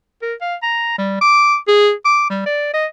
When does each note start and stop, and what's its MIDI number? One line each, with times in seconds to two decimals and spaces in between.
0.22 0.34 70
0.41 0.55 77
0.63 0.95 82
0.98 1.18 55
1.21 1.56 86
1.68 1.91 68
2.05 2.25 86
2.30 2.43 55
2.46 2.71 74
2.73 2.86 75